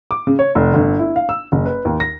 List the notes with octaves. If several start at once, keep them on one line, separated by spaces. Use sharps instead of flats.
D6
C#3
C#5
F1
G1
E4
F5
E6
F#1
B4
D#2
A#6